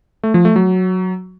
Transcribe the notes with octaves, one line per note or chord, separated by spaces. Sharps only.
A3
F3
A3
F#3